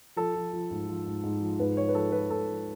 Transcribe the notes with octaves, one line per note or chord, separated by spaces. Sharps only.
F3 A4
F3
F3
G#2
F3
G#2
G#2
F3
G#2 B4
F3 C#5
B4
F3 A4
F3 B4
G#2 A4
F3